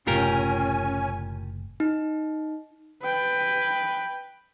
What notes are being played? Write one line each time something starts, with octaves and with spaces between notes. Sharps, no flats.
F#1 A2 C3 C#4 F4 G4 A#4 G#5
D#4
B4 G5